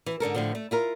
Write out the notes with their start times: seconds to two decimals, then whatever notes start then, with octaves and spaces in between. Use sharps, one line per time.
0.06 E3
0.20 G#2 D3 A4 A#4
0.35 A2 D3 F3
0.55 A3
0.71 E4 F4 A#4